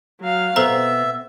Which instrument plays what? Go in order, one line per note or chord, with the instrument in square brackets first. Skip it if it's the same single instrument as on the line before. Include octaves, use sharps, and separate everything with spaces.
[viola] F#3 F5
[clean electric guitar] B2 B3 [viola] C4 [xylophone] A4 C5 A#5 [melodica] E5